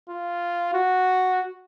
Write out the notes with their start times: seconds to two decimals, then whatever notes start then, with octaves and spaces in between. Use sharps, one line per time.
0.09 F4
0.74 F#4